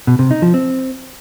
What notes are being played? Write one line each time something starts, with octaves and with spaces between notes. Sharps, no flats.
B2
C3
D#4
F3
C4